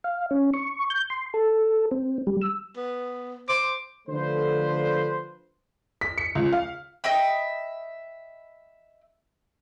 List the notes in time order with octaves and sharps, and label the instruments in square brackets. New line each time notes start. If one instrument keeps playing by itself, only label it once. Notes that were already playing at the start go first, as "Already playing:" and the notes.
[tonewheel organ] F5
C#4
C#6
G6
C6
A4
C4
G3
E6
[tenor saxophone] B3
[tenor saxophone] C5 [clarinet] D6
[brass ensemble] D3 F3 A3 B4 C5
[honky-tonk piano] B6
C#7
C#2
F5
[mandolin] D#5 E5 G5 B5